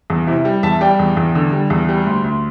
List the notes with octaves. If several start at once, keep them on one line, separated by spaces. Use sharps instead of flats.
E2
C3 E4
G3
E2 E5 A5
G3 D5 G5
E2
E2
D3
G3
E2
G3
D2
D2